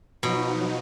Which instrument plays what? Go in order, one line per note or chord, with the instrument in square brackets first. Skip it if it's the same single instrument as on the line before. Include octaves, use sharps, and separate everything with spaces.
[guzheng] B2 [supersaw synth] F3 F#3 D#4